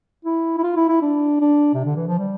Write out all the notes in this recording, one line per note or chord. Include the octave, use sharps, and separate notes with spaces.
E4
E4
F4
E4
E4
D4
D4
C3
D3
E3
F3
G3